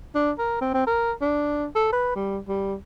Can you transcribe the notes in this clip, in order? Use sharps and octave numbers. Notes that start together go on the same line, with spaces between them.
D4
A#4
C4
C4
A#4
D4
A4
B4
G3
G3